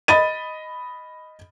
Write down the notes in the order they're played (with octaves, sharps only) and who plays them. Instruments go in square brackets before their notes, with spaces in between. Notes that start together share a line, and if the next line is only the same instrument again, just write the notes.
[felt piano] D#5 B5 A6 D#7